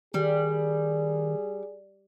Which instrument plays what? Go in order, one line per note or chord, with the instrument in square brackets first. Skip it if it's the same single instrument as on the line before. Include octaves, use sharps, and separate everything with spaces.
[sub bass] D#3 [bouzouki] G3 [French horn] G#4